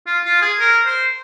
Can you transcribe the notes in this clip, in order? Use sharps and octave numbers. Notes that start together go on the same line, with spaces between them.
F4
F4
G#4
A#4
C5